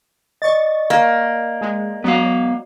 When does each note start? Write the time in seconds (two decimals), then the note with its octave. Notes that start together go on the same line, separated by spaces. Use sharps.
0.42 D5 D#5 C#6 A6
0.90 A#3
1.61 G#3
2.04 F#3 B3 F5